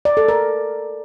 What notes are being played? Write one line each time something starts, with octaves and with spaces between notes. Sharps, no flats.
D5
A4
A#4